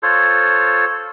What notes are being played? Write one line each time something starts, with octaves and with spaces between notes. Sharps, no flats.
F4 A4 C5 C#5